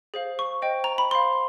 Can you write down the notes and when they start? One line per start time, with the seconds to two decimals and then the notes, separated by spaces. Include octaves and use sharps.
0.14 G#4 C5 F5
0.39 C#6
0.62 C5 D#5 G5
0.84 A#5
0.98 B5
1.11 C5 F5 C6